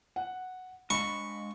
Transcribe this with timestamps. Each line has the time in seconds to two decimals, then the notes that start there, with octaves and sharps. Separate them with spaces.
0.16 F#5
0.90 G#3 D4 D#5 B5 C#6